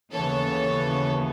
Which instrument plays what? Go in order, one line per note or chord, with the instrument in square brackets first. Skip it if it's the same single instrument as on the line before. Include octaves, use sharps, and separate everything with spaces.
[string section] D#2 C#3 E3 B3 A4 C#5